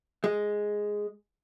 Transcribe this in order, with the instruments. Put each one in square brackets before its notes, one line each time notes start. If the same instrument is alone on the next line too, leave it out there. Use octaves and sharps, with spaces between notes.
[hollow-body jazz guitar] G#3